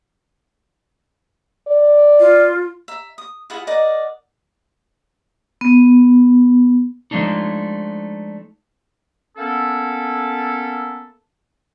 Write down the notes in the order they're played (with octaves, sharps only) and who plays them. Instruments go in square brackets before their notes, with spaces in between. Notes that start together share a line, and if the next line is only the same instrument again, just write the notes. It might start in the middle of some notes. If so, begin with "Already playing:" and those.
[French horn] D5
[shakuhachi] F4
[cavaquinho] E5 A#5
D#6
E4 F4 G#4 F#5
A#4 D5 D#5 F#5
[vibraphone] B3
[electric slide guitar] F3 G#3 A3 D4 D#4
[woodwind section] A#3 B3 C#4 E4 A4